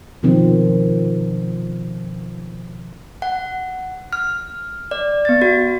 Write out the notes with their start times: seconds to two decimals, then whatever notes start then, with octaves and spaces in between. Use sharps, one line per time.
0.23 B2 D#3 F3 C4
3.22 F#5
4.13 F6
4.91 D5
5.25 B3 A6
5.42 F#4